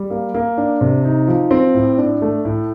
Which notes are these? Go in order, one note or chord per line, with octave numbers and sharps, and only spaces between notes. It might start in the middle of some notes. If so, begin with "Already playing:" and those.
Already playing: G3
A#3
A#3
D4
C3
D#4
F3
C4
A2
D4
A3
A2